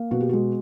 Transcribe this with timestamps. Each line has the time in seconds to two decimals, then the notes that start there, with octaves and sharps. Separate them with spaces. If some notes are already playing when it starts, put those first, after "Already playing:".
Already playing: A#3
0.11 B2 F#4
0.21 G4
0.29 G#3 F#4